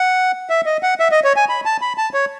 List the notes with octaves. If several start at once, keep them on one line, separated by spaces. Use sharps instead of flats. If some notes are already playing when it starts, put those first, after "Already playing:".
Already playing: F#5
E5
D#5
F#5
E5
D#5
C#5
G#5
B5
A5
B5
A5
C#5